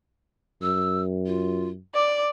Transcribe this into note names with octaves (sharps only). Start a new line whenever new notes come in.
F#2 E6
F4
D5 D6